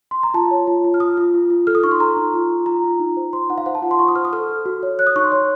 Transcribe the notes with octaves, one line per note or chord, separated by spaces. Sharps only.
C6
A#5
F4 A5
C#5
F4
F4
F6
F4 D#6
F4
F4
F4
A4 F6
D#6
D#4 C#6
C6
A4 A#5
D#4
F4
F4
F4 A#5
F4
D#4
C5
C5 C6
D#4 F#5
F5
C5 F#5
A5
F4 F#5
C6
F4 C#6
D#6
C5 F6
D#6
A4 F6
A4
F#4
C#5
C#5 F#6
D#6
D#4 C#6
C6
C#5